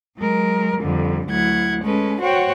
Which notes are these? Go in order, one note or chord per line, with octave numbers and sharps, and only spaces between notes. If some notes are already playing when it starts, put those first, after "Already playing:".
F#3 G#3 A#4
F2 D3 G3
D2 F#3 E4 F#5 G#6
G#3 C#4 A4 B4
F#4 C5 C#5 F#5 G5